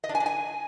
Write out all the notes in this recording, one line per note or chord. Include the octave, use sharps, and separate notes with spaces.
D#5
D4
G#5
D4
G#5